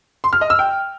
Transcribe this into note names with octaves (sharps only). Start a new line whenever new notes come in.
C6
F6
D#5
E6
G5